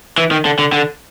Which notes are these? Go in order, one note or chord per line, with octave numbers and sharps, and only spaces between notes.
E3
D#3
D3
D3
D3